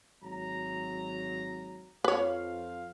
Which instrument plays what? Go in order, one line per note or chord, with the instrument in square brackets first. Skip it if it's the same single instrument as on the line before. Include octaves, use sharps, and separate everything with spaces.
[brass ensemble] G#1 F#3 A#5
[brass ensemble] F2 F3 F5 [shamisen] B4 C#5